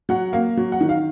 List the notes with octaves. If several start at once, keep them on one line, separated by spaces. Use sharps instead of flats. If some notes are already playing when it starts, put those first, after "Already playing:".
F#3 F#5
A#3 F5
F#3
F#5
D#3
F5